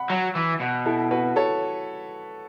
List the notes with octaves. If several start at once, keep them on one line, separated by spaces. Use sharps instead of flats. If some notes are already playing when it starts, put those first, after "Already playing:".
Already playing: F#5 B5
F#3
E3
B2
E4 A4
F#4 B4
A4 C#5